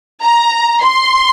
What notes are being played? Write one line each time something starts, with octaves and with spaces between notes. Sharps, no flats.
A#5
C6